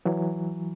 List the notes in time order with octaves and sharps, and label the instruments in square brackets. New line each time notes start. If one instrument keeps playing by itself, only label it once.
[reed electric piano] E3 F#3